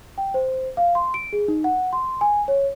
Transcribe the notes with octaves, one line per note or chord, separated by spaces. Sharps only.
G5
C5
F5
C6
D7
G#4
D#4
F#5
C6
G#5
C#5